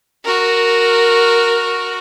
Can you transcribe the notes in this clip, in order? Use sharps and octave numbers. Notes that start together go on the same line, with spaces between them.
F#4 A#4